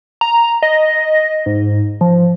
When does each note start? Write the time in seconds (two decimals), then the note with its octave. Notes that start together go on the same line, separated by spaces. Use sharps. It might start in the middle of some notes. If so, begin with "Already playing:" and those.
0.21 A#5
0.63 D#5
1.46 G#2
2.01 F3